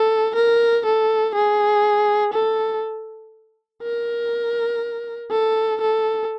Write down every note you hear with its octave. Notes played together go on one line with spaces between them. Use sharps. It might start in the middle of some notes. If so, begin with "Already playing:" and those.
Already playing: A4
A#4
A4
G#4
A4
A#4
A4
A4